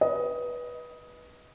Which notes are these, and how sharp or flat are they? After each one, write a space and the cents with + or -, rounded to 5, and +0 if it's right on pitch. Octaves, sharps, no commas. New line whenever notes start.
B4 -15 D#5 +15